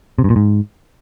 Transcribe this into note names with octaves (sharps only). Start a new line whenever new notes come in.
C3
G2
A#2
G#2